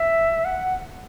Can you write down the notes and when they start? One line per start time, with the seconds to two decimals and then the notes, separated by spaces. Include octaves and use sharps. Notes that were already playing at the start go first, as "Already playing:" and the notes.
Already playing: E5
0.45 F#5